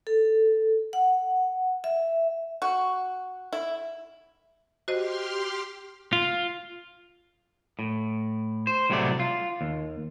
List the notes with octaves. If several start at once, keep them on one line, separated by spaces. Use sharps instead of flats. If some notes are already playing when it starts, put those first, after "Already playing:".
A4
F#5
E5
F#4
E4
F#4 G4 C5 D#5 C6 F6
F4
A2
C5
C2 A2 C3 F#3 A3 D5
F4
D#2